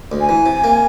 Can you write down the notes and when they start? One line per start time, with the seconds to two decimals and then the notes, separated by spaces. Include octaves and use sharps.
0.12 D2
0.20 G#5
0.29 E3
0.46 C3
0.64 A#3